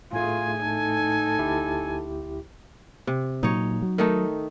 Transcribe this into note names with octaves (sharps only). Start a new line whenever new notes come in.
A2 A3 F4 G#4 G#5
D#4 A4
D2 E4 G4
C3
A#2 F#3 D#4 C#5
F#3
D#3 A3 D#4